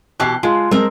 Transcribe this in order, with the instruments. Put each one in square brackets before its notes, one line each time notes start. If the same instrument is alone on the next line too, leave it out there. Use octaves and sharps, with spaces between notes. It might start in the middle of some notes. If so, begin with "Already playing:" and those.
[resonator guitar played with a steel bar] B2 E3 G4 [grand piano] F#6 C7
[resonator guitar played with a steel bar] G#3 [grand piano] F4
[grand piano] G#3 [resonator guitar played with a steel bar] C4 A#4